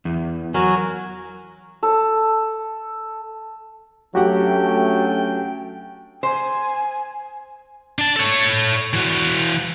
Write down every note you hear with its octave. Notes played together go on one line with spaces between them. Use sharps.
E2
F#3 F#4 A#4 G#5
A4
F#3 A3 C#4 D4 F#4 G4 F#5 G5
C5 G#5
D4 A5
A4 C#5
E3 F#4